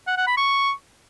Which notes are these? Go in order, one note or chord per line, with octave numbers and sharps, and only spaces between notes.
F#5
F#5
B5
C#6